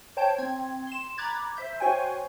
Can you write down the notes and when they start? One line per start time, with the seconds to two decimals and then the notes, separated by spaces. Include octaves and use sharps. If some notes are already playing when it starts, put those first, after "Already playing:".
0.17 C5 C#5 G5 A5 G6
0.38 C4 G#6
0.87 C6 E7
1.18 A#5 B5 D6 F#6 G#6 A6
1.56 C5 E5 G6
1.80 F#4 C5 C#5 G5 G#5